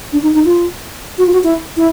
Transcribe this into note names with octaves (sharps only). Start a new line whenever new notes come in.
D4
D#4
D#4
F4
F#4
F4
F#4
E4
E4